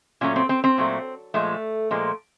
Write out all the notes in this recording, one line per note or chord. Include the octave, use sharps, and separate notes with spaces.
A#2 F#3 A3 C#4
C4
C4
C4
A#2 F#3 A3
A#2 F3 G#3 A3
A#2 F3 G#3